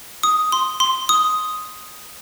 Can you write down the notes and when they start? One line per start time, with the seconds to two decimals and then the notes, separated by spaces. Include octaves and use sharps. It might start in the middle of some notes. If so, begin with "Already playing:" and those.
0.23 D#6
0.52 C6
0.80 C6
1.09 D#6